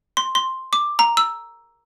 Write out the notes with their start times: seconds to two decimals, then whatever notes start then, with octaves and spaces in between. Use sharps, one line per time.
0.17 C6
0.35 C6
0.73 D6
0.99 A#5
1.17 E6